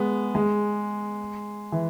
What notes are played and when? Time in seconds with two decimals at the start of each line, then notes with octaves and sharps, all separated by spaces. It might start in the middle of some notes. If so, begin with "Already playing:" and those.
Already playing: G#3 B3
0.35 G#3
1.72 E3